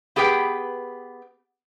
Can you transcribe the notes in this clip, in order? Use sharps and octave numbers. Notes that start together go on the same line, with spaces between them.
B3 G4 G#4 B4 G5